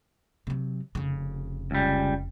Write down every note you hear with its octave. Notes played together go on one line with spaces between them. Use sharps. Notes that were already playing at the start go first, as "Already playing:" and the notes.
C3 F#3
F1 C#3
C#2 G3